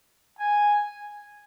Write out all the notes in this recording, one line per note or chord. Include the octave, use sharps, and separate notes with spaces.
G#5